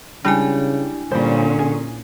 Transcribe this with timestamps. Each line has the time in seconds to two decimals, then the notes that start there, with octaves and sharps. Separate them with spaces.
0.25 C#3 G3 G#3 D4 E4 G#5
1.12 A#2 D3 G3 C#4 C5
1.59 G#4